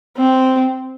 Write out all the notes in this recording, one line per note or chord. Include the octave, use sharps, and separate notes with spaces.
C4